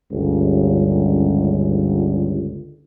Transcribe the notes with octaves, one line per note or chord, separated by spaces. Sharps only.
G1 C#2